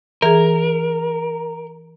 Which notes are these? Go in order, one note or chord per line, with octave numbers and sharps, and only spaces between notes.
E3 G#4 A#4